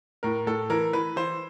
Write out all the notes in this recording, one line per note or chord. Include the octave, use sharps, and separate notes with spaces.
A2 A#4
A2 A4
E3 A#4
E3 B4
E3 C5